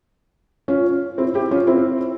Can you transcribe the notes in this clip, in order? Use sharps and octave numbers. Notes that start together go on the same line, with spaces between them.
C#4 F4
C4 E4
E4 G4
C#4 F4
C4 E4